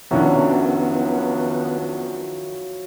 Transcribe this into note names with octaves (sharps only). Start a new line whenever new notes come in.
F2 D#3 F3 F#3 B3 C#4 D4 E4